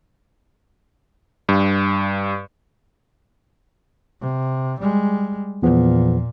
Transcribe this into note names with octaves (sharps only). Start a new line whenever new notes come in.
G2
C3
G3 G#3
E2 A#2 F3 B3